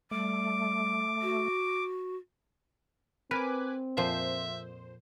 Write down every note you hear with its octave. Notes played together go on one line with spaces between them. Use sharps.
G3 A3 D6
F#4
C4 A#4 B4 G#5 D6
F2 A#2 F3 C5 E5